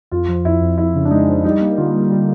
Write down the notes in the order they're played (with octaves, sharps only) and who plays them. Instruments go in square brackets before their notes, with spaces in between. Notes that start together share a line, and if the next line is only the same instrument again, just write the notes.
[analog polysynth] F2 [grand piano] F4
[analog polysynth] F3
[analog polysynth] F2 [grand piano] E4
[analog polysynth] F2
[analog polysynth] F2 [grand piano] E4
[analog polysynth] C#3
[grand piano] D4
[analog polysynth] G#3 [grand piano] D#4
[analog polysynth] F3
[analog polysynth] G3 [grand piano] D#4
[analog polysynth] A#3
[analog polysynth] D3 [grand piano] F4
[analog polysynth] G3
[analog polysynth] G3 [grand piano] F4